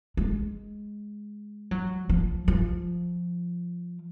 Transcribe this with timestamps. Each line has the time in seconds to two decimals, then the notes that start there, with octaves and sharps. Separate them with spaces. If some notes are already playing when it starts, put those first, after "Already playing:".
0.17 G#3
1.71 F#3
2.09 F3
2.48 F3